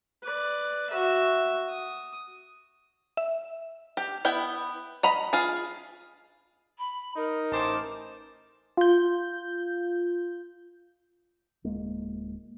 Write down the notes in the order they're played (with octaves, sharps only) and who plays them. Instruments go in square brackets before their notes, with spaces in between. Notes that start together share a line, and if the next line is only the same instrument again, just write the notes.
[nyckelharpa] B4 D5
F#4 E5
D#6
[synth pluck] E5
[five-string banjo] G4
B3 E4 G5
D#5 A#5 B5
F4 G#4
[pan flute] B5
[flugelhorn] D#4 [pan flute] A#4
[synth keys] A1 D6 [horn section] E3 C5 A5
[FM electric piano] F4 G6
[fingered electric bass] D1 G#3 A#3